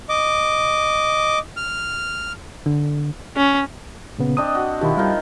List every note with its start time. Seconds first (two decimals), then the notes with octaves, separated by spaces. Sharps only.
0.09 D#5 D6
1.57 F6
2.66 D3
3.36 C#4
4.18 A#2 C#3 B3
4.37 C4 D4 D#5 D#6
4.55 F#4
4.81 B2 D#3 F3 E4 G4
4.97 D#3 G3 F4